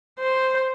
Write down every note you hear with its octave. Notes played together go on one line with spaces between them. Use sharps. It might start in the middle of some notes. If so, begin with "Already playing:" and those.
C5